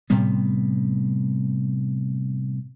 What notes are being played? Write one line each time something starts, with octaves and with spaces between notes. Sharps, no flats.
A2 C3 G3 B3